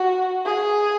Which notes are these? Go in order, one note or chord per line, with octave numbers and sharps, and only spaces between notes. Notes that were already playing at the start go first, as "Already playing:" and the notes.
Already playing: F#4
G#4